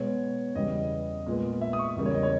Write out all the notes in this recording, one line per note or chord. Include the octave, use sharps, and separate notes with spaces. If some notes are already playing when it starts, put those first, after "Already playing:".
Already playing: B2 G#3 B3 C#5
E2 C#3 G3 B3 D#5
A#2 G#3 B3
E5
D#6
C#6
E2 C#3 G3 A#3
C#5
D#5
C#5